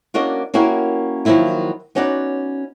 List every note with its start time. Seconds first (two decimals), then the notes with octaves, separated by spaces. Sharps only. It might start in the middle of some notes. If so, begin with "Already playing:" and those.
0.14 A#3 C#4 D4 F#4 A#4 D#5
0.54 A#3 C#4 E4 F#4 G4 A#4
1.25 D#3 F3 F#3 A#3 E4 F4
1.95 B3 C#4 D#4 F#4 D5